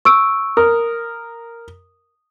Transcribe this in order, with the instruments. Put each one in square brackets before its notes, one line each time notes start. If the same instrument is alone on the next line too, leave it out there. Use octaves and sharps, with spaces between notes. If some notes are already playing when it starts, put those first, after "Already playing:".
[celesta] C#6 E6 D7
[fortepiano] A#4 [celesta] D#6